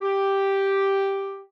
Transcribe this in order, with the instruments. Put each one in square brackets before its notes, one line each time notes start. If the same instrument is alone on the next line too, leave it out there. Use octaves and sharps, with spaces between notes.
[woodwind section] G4